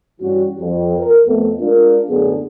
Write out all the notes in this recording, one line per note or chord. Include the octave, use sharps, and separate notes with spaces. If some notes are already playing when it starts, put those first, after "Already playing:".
G2 E3 G3 C#4 F#4
F2
A#4
F2 A3 B3 A4
G#3 D4 F4 A#4
F#2 A2 D3 F#3 B3 G#4